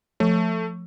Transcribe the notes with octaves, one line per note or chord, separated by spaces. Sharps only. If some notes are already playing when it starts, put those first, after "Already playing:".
F3 A3